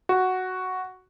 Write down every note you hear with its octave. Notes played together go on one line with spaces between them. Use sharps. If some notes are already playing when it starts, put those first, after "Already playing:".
F#4